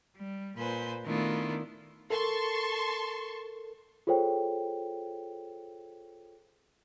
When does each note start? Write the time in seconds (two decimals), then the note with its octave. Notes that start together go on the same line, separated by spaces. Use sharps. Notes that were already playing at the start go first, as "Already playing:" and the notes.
0.17 G3
0.58 A#2 B4 C5 G#5 G6
1.05 D#3 A3 B3 D4 E4 F4
2.10 A4 A#4 A5 C6 C#6
4.07 F4 G#4 A4 C5 C#5 G5